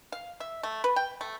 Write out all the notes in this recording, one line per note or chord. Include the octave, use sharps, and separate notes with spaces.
F5
E5
A3
B4
G5
A3